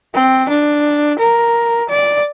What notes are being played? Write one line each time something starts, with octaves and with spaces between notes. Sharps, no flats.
C4
D4
A#4
D5